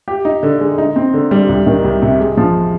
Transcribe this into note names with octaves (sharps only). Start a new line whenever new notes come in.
G4
D#4
D3
G#3
D#4
C4
D3
G3
C2
D#3
C2
C3
G#3
F3